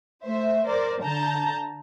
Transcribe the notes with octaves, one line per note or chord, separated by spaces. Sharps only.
A3 C5 E5
A#4 C5 D5
D3 A5 A#5 G6